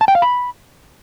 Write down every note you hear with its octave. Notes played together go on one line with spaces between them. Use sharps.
A5
G5
F5
B5